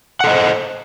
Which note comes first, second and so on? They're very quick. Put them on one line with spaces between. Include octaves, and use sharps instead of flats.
F#5 A4 D#5 C5